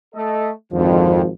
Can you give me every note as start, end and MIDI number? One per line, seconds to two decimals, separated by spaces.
0.14 0.50 57
0.14 0.50 69
0.14 0.50 75
0.72 1.28 32
0.72 1.22 41
0.72 1.15 50
0.72 1.30 53